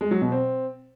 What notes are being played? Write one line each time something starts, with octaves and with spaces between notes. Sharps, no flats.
G#3
F#3
B2
C4